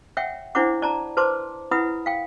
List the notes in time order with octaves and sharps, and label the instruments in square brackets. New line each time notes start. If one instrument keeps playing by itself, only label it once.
[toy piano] C#5 E5 F#5 G5
D4 E4 C5 C#5 F#5 D6
D5 A5 A#5
B4 C5 A5 C6 D6
E4 B4 F#5 B5 D#6
F5 G5